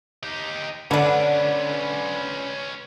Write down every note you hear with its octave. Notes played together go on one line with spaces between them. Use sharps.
D#4 G4
D3 B3 C#4 D4 B4